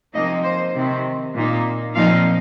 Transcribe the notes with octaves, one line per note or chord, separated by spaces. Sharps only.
C3 F3 A#3 D#4 D#5
C5
C3 D#3 C4
A#2 A#3 D#4
A#2 F3 C4 D#4 F5